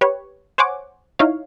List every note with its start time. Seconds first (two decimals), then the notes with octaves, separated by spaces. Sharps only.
0.01 G4 B4 C#5
0.58 C5 C#5 F#5 G#5 D6
1.19 D#4 E4 C#5 F5